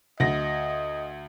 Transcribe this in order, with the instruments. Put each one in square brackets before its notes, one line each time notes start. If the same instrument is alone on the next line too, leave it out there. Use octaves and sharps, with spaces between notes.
[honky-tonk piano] D2 A#6 [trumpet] D#5